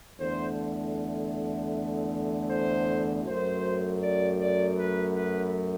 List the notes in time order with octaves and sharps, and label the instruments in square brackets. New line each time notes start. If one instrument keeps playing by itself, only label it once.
[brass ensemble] E2 D3 A3 C5
C5
F#2 F#3 A3 C5
D5
D5
B4
B4